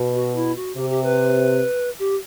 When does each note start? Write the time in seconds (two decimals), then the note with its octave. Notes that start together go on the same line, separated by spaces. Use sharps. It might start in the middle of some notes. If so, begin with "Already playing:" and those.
Already playing: B2
0.15 F#4
0.35 E4
0.55 F#4
0.75 C3 G4
0.89 G4
1.03 B4
1.99 G4